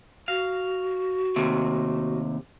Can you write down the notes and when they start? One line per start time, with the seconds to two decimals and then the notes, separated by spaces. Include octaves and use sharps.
0.28 F#4 F5
1.36 D#2 C3 A3